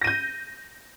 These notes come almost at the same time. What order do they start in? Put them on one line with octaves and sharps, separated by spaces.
A#6 D#7 G6